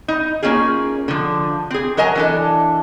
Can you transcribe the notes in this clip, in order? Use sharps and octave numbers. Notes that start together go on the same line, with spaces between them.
D#4
A#3 C#4 D#4 F4 G#4
D3 F3
C4 G#4
F#3 A#4 D#5 G#5 A#5
E3 D4 A4